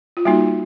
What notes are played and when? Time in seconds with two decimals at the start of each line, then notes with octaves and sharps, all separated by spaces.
0.17 F4
0.25 G3 A#3 D#4 F#4